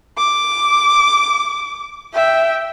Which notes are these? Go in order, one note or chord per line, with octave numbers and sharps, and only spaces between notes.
D6
E5 G5